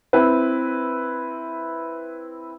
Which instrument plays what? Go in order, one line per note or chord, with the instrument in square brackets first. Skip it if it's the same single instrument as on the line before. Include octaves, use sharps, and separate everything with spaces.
[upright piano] C4 E4 B4